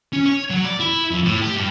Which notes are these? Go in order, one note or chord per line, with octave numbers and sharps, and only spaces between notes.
C#4
C#5
F#3
D5
E4
F2
A2
G4
G2